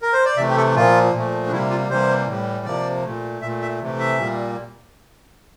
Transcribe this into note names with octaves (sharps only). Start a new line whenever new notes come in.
A#4
C5
D5
C3 E3 A3 E5
G4
A4
A#2 F3 A#3 F4
A#2 F3 A3
D4
C3 G3 A#3 E4
F4
C3 E3 G3 A#3 C5
A2 E3 G3
C3 F3 A#3 D5
A#2 A3
A#2 E5
A3
E5
C3 E3 A3
E5
A#2 G3 A#3